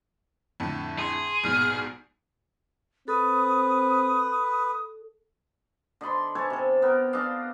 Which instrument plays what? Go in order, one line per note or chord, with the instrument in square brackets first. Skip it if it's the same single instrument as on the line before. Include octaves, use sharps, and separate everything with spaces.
[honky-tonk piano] F2 A2 D3
[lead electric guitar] G#4 [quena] C6
[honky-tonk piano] A#1 G#2 B2 [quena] F6
[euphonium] C4 [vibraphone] A4 [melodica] B4 [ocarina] D#6
[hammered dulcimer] D3 D#5 B5 C6
A4 C#5 G#5 A5
C3 A4
B3 A#4 G5
D4 A4 D#5 F5